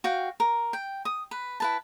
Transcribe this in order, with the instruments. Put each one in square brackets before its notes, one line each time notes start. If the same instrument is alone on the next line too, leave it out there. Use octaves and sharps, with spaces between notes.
[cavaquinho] F#4 F5 G5
A#4
G5
D#6
B4
E4 B4 A5